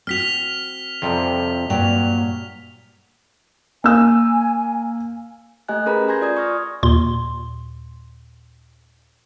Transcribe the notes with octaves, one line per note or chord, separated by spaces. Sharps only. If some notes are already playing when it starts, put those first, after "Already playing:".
C4 F#4 F6 B6 F7
F2 C3 G3
G2 A#2 F#3 G5 F7
A#3 G#5 E6
A3 G4 D#5 G#5 F#6
C#4 G#4 A#4 B4 A#5 B5
G#5 C6 G6 G#6 A#6
F4 D5 D#6 G#6
C#6 D#6 F6 A#6
D#2 A#2 C6